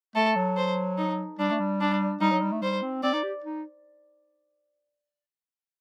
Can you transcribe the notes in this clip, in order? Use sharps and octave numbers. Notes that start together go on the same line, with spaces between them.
A3 A4
F#3
C5
D#4
G3 D4
A3
G3
D4
G3 D#4
F#3
G3
A3
G3 C5
C4
C4 D5
D#4
G4
D#4